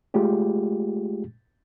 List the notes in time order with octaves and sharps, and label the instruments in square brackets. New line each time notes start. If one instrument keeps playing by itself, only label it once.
[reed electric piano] G#3 A3 F4 G4 G#4